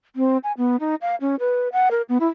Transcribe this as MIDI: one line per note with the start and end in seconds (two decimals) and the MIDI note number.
0.16 0.37 60
0.44 0.52 80
0.57 0.76 59
0.80 0.95 63
1.02 1.16 77
1.21 1.35 61
1.39 1.68 71
1.72 1.88 78
1.91 2.02 70
2.09 2.18 59
2.20 2.27 64